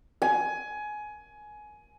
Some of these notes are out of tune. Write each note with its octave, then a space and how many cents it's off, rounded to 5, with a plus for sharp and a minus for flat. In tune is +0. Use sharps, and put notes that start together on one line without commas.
G#5 +20